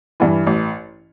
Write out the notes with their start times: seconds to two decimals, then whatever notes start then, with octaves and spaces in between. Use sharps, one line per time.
0.20 G2 E3
0.47 A1